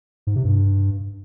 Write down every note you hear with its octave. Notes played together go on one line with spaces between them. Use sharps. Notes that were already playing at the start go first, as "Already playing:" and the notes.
G#2
C3
G2